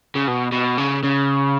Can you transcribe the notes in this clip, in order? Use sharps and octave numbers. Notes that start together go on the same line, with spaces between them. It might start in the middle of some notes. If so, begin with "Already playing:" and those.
C#3
B2
B2
C#3
C#3